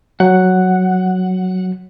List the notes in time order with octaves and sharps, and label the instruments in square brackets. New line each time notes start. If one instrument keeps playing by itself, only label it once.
[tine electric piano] F#3 [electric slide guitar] F#5